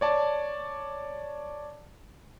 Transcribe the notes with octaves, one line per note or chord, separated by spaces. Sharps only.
C#5 D5 A5